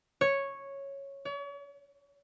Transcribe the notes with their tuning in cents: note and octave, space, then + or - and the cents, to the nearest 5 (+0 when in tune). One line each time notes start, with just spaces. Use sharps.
C#5 -5
C#5 +40